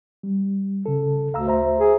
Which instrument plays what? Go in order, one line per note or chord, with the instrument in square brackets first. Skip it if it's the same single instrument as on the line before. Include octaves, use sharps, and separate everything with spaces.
[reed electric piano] G3
C#3 A4
[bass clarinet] D2 [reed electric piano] F5 A#5 E6
[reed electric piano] C5 E5 A#5
[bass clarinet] G#4